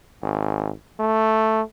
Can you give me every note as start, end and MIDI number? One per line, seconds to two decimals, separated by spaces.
0.22 0.71 32
1.00 1.62 57